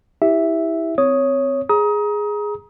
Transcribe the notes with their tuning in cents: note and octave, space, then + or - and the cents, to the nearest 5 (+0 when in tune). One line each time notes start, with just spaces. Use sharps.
E4 -20 G4 +10 E5 +0
C4 -25 C#5 +0 D#6 +0
G#4 +0 A#5 +25 D#6 +25